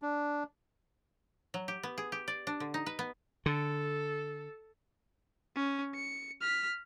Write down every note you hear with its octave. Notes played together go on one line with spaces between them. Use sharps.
D4
F#3
G4
B3
G#4
G4
D5
D4
D3
D#4
B4
B3
D3 A4
C#4
C#7
F6 B6